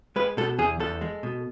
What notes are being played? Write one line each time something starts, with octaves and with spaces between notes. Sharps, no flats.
G#3 B4
B2 A4
E2 G#4
E2 A4
G#3
B2